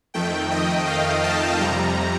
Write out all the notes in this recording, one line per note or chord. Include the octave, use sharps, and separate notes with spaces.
F2 D#3 A3 G5
D#5
F5
A5
F2 C3 G3 A#5